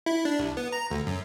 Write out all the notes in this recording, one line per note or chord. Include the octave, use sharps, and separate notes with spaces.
E4
D4
C2
B3
A#5
D2
F#2